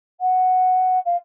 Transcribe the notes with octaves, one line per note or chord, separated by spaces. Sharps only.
F#5
F5